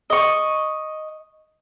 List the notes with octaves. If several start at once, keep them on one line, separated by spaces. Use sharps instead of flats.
D#5 C#6